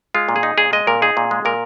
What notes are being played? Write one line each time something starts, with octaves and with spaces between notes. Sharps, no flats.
G#3 F4
A#2
G#4
D#4
A#2 G#4
G#3 D#5
A#2 A#4
D#4 G#4
A#2
G#3
A#2 A#4